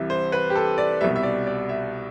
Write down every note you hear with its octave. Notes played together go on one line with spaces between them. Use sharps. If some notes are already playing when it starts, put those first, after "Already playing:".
Already playing: C2 C3 E3 G3 E5
C5
B4
G4
A4
D5
C2 B2 G3 E5
E5
D5
D5
E5